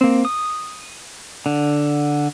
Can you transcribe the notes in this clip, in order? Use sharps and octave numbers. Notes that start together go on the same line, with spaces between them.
A#3 C4
D#6
D3